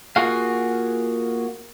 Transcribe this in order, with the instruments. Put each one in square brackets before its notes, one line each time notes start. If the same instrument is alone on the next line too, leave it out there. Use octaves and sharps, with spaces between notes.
[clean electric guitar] A#3 F4 F#4 G#4 F5